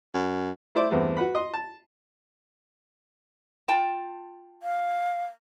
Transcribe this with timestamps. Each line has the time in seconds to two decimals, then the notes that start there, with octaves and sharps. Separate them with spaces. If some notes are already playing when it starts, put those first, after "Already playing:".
0.14 F#2
0.75 A3 E4 C5 D5
0.90 E2 G2 A3 B3 C4
1.17 F#4 B4 F#5 B5
1.35 D#5 C6
1.54 A5
3.68 F4 G5 A5
4.63 F5